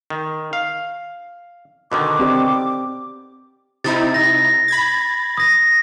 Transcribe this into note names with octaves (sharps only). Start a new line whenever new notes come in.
D#3
F5
B2 D3 D#3 D6
C4 G4 D5
C3 D#4 E4 A6
A#6
B5 G#6 A6
D#6 A#6